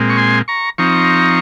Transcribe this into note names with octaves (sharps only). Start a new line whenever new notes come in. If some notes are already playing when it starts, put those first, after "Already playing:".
Already playing: A#2 G#3 C4
C#6
G#5 C6
A#5 C#6
F3 C4 D#4 A#5 C#6